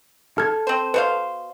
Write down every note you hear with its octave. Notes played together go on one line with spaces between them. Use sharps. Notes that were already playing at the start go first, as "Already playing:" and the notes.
A4 F6 G#6
C4 C5
B2 B4 C5 F5